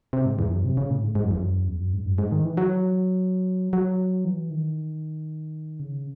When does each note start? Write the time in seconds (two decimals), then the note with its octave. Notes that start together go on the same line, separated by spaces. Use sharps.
0.13 C3
0.26 G#2
0.39 E2
0.51 F#2
0.65 C3
0.77 C#3
0.91 A2
1.03 G#2
1.15 G#2
1.24 F#2
1.31 E2
1.39 F#2
1.68 E2
1.80 F#2
1.93 G#2
2.05 F#2
2.18 G#2
2.32 D#3
2.44 E3
2.57 F#3
3.73 F#3
4.25 E3
4.51 D#3
5.80 C#3